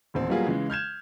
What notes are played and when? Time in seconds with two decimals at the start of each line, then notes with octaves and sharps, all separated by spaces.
0.14 D#1 A1 C4
0.29 F#3 G3 A#3 B3 F4 G#4
0.47 C#3 E3 G#3
0.70 F6 G6 G#6 E7